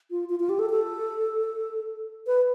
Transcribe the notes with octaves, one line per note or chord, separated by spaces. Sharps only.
F4
F4
F4
G4
A4
A4
B4